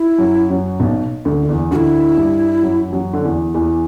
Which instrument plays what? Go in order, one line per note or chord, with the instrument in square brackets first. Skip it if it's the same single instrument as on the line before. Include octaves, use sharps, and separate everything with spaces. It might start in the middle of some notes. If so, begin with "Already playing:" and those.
Already playing: [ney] E4
[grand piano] F#2 F#3
F#2 F#3
B1 B2
D2 D3
D3
E2 E3
[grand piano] D2 D3 [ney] F#4
[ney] E4
[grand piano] G2 G3
F#2 F#3
E3
F#2 F#3
D3
E2 E3
E2 E3